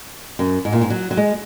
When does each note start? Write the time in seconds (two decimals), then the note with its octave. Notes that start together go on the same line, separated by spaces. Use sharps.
0.39 F#2
0.65 G#2
0.73 A#2
0.81 G#2
0.90 F#3
1.11 F#3
1.17 G#3